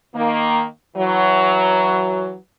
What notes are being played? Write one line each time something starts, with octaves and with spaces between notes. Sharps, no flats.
D#3 A#3
E3 F#3